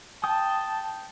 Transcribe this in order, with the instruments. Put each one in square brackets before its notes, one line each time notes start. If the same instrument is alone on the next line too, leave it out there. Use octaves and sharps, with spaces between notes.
[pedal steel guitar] G5 D#6 [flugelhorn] A5